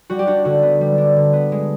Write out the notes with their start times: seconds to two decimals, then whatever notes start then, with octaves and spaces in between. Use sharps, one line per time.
0.10 G3 F#4
0.19 G4
0.27 D4 F#4
0.45 D3 F#4
0.63 B3
0.81 G3
0.98 D4
1.16 D3
1.33 B3
1.52 G#3